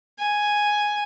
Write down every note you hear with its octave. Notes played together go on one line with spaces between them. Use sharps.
G#5